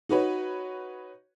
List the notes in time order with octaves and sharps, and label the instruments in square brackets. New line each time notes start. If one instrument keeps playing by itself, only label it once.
[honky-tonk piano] D#4 F#4 B4 C#5